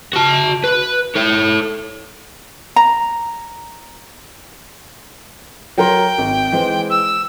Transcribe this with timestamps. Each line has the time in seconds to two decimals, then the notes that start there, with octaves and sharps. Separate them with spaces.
0.13 F#4 A5
0.64 B4
1.15 A4 C#5
2.76 A#5
5.78 F#3 A#4 G5 C6
6.18 G#1
6.52 E3 G#3 C5
6.90 E6